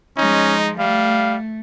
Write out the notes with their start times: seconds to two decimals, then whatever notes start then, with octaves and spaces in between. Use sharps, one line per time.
0.17 F3 G#3 C#4 D#4
0.79 G3 A3 F5